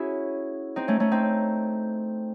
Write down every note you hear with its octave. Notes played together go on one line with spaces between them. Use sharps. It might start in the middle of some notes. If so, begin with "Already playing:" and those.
Already playing: C#4 E4 F#4 G#4
C4 D#4
A3 C#4
A3 C#4
C4 D#4